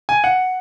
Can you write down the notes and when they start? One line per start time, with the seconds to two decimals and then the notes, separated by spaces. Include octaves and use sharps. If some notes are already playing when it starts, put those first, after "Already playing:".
0.09 G#5
0.24 F#5